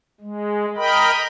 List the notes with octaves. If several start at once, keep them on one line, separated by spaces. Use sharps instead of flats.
G#3
A#4 D#5 G5 B5